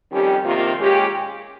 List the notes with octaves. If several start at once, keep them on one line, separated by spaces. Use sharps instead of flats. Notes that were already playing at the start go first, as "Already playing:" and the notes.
F2 D#3 G3 C#4 G4
F2 C3 D#3 A#3 F4
A#2 G#3 C#4 G4